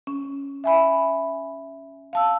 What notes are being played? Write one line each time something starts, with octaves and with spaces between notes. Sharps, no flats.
C#4
E5 G#5 B5
F5 A5 E6